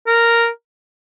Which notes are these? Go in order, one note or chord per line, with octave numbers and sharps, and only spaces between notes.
A#4